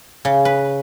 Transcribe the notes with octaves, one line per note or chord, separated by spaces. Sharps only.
C#3
B4